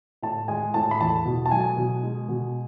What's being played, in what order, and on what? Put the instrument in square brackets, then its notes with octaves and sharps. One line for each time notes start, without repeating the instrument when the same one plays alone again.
[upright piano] A2 A5
G#3 G#5
A2 A5
B5
E2 A5
B2
A5
F#3 G#5
B2
G#3
B2